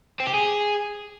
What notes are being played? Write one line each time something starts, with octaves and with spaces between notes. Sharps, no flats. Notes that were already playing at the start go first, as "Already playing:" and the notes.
C4
G4
G#4